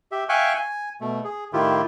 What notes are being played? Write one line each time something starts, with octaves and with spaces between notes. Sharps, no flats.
G4 E5
E5 F5 G5 G#5 C#6 F#6
G#5
B2 A3
G#4
A2 D#3 E4 F4 G4